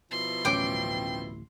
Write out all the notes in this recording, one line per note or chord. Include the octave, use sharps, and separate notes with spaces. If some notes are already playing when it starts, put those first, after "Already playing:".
B2 F3 E4 C6
D1 A1 C#4 G5 D6